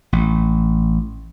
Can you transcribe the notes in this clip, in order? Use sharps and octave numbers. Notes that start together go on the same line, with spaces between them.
A1